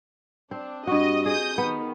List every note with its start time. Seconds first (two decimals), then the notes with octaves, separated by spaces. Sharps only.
0.51 C4 D4
0.87 G2 F#4 D#5
1.26 G#4 D#5 D#6 G6
1.58 D#3 B3